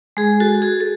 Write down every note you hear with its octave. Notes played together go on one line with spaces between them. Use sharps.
G#3 G#4
F#4 A4
F#4 G#4
A4